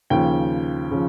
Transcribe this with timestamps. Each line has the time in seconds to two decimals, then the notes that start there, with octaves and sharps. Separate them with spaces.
0.10 D#2 C#3 F3 G5
0.91 C#3 F3